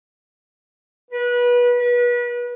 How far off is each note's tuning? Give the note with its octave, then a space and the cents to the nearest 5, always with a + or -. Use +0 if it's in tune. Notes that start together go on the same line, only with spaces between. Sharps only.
B4 -25
B4 -30